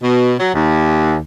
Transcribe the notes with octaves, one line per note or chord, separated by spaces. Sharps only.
B2
F#3
D#2